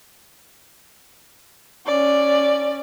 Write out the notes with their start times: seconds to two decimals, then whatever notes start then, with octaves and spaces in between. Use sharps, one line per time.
1.87 C#4 D5